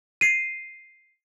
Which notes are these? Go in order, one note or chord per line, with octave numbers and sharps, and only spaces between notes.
C7 D#7